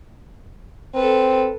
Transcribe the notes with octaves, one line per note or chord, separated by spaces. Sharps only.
C4 A4 B4